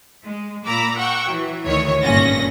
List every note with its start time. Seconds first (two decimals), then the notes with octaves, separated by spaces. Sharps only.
0.24 G#3
0.66 A#2 A#5 B5 D6 E6
0.97 F#5 G5 C#6 E6
1.28 E3 F#3
1.64 D2 A2 D#3 E3 C#5 G#6
2.03 G#1 G2 A#2 C#4 A#6